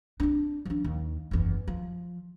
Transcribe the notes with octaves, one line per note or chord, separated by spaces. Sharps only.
C4 D4
F3 D4
D#2
F#1 E2
F3